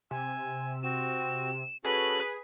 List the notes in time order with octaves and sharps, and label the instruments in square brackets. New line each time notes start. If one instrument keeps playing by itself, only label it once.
[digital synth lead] C3 [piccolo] G#5 [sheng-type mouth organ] E6
[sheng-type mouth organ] C4 F#4 [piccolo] E7
[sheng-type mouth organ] C#4 F#4 A4 [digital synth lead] G#4 [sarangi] B4 [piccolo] F#7